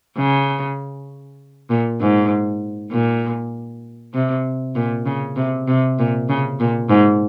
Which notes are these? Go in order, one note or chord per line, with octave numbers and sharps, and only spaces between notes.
C#3
A#2
G#2
A#2
C3
A#2
C#3
C3
C3
A#2
C#3
A#2
G#2